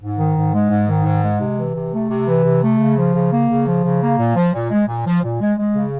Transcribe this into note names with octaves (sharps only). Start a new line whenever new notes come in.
G#2
D#3
G#2
G#3
G#2
D#3
G#2
G#3
C3
E3
C3
A3
C3
E3
C3
A3
C#3
F3
C#3
A#3
C#3
F3
C#3
A#3
A#2
F3
A#2
G#3
A#2
F3
A#2
G#3
G#3
C#3